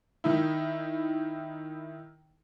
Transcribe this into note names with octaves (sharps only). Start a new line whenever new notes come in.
D#3 D#4 E4